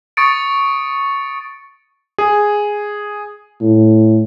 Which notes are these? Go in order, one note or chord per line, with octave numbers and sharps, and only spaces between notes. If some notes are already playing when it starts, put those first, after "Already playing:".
C#6 D#6 A6 C#7 D7
G#4
A2